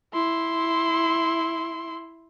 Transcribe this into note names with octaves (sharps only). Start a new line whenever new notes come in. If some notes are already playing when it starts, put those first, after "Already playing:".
E4 C6